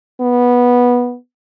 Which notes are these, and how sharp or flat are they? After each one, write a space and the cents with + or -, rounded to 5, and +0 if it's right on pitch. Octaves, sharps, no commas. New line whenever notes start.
B3 -15